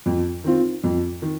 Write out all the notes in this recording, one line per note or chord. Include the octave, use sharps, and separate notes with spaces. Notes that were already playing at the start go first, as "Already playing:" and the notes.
F2
D#3 C4 F4
F2
D#3